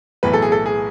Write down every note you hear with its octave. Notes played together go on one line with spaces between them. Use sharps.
B1 A2 E3 B4
A4
G#4
A4
G#4